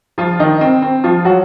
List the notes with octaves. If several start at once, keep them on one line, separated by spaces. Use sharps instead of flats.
F3 F4
D#3 D#4
C4
C4
F3 F4
F#3 F#4